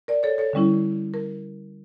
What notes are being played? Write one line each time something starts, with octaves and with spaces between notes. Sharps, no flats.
A#4 D5
A4 C#5
A4 C#5
D3 G3 C#4 E4
A#4